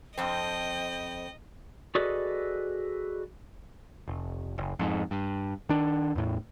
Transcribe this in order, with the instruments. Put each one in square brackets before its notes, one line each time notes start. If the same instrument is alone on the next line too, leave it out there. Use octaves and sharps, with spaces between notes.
[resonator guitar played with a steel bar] F2 C4 [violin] D#5 [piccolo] G5
[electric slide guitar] F#4 G#4 A4 B4 D5 D#5
[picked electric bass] F1
F#1
F2 G#2
G2
D#3 D4
E2 A2